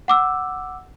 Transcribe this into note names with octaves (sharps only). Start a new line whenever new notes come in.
F#5 D6 E6